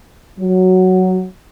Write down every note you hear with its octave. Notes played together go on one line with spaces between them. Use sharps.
F#3